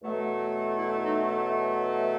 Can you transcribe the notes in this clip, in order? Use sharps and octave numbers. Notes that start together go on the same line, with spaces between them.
E2 B2 F#3 A3
E4
D#4